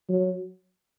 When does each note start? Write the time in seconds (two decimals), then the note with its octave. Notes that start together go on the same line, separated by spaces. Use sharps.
0.09 F#3